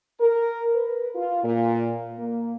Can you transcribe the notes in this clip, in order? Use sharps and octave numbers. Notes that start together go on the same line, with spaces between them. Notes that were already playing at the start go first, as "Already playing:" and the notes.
A#4
B4
F4
A#2
A#3